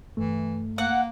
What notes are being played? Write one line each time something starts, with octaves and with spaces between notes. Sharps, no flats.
G2 E3 A3
A#3 F#5